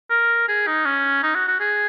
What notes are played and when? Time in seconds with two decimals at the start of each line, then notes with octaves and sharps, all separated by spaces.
0.10 A#4
0.48 G#4
0.67 D#4
0.86 C#4
1.23 D#4
1.35 F#4
1.48 F#4
1.60 G#4